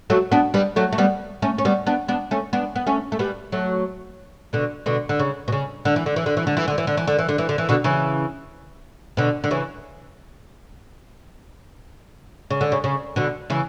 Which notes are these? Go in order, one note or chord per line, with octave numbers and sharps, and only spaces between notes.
F#3 A3
B3 D4
G3 B3
F#3 A3
A3
G3 B3
A3 C#4
C#4
G3 B3
B3 D4
B3 D4
A3 C#4
B3 D4
B3
A3 C#4
A3
G3 B3
F#3 A3
B2 D3
B2 D3
D3
C#3
B2
C#3
D3
E3
D3
E3
D3
E3
D3
E3
D3
E3
D3
E3
D3
E3
D3
E3
D3
E3
B2 D3
C#3 E3
B2 D3
D3
C#3 E3
C#3
D3
C#3
C#3
B2 D3
C#3 E3